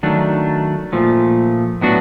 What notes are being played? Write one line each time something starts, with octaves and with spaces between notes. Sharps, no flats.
D#3 F#3 A3 D4
A#2 F3 A3
A2 F#3 B3 D4 F#4